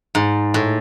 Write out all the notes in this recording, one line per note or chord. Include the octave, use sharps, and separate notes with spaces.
G#2
A2